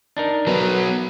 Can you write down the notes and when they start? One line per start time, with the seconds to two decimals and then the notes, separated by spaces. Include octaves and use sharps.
0.17 D4 D#4 A#4
0.47 F#3 B3 A#4 B4